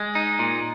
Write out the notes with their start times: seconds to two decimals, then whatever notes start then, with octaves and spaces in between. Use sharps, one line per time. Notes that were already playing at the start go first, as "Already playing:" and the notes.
Already playing: G#3
0.15 D#4
0.39 A#2